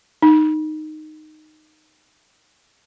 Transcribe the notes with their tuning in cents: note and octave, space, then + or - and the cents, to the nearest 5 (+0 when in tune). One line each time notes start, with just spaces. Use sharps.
D#4 -10